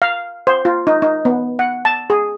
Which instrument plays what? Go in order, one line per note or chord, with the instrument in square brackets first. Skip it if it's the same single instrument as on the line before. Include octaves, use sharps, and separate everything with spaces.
[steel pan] F5
C5
F4
D#4
D#4
B3
F#5
A5
G#4